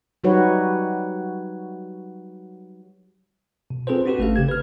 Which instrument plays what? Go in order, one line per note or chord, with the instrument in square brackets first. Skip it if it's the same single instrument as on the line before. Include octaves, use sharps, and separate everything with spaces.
[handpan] F#3 G3 D#4 F#4 B4 C#5
[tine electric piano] B2
C4 F4 G#4 A4 B4 C5
C4 D4 F#4 G4 B4
G#1 A3 C#4 A4 F5
C#3 G4 G#6
B4 F6